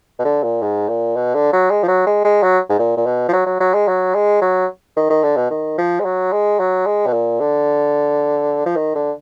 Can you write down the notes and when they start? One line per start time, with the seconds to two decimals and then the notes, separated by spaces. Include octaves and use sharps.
0.19 B2
0.25 D3
0.43 A#2
0.62 G#2
0.89 A#2
1.16 B2
1.34 D3
1.53 F#3
1.70 G#3
1.83 F3
1.88 F#3
2.06 G#3
2.24 G#3
2.43 F#3
2.69 G#2
2.79 A#2
2.97 A#2
3.06 B2
3.28 F3
3.33 F#3
3.47 F#3
3.60 F#3
3.74 G#3
3.88 F#3
4.15 G#3
4.41 F#3
4.96 D#3
5.10 D#3
5.23 D3
5.37 B2
5.51 D#3
5.78 F3
6.00 G#3
6.05 F#3
6.32 G#3
6.59 F#3
6.86 G#3
7.07 B2
7.13 A#2
7.40 D3
8.66 F3
8.76 D#3
8.95 D3